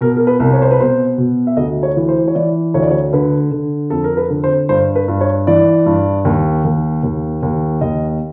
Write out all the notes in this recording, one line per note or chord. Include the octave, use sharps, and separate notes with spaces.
B2 A#4
A#4
B4
C2
C#5
C5
B4
B2 C5
B2
E5
D2 D#5
C#5
E3
C5
C#5
E3 D5
D2 C#5
D5
C#5
D3 B4
D3
F2 A4
A#4
B4
D3
C5
G2 C5
B4
G2
C#5
E3 D5
G2
D#2
D#2
D#2
D#2
D#2 D#5